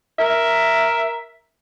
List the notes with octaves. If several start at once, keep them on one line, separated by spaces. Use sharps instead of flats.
A#4 E5